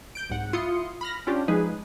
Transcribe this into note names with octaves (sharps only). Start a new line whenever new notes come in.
G6 D7
C2 G#2 F#5
E4 F4 C6 D#6 C#7
B5 F6 A#6
C#4 D4 F4 G4
F3 G#3 D#4 G#4 B4